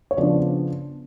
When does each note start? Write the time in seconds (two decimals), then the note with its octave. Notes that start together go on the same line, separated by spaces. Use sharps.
0.11 C#5
0.17 C#3 F3 B3 D4 D5